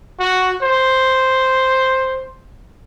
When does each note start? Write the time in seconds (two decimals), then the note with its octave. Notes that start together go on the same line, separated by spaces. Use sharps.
0.19 F#4
0.62 C5